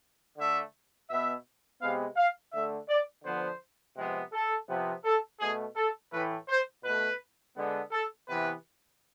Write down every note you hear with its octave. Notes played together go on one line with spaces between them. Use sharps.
D3 A3 E5
B2 B3 E5
C3 G#3 B3 F5
F5
D3 A3 E5
D5
D3 F3 B3 C5
C3 F3 G#3 B3
A4
C3 F3 B3
A4
B2 A3 G#4
A4
A2 E3 A3 B4
C5
B2 A3 B4
D3 G#3 B3
A4
C3 E3 B3 B4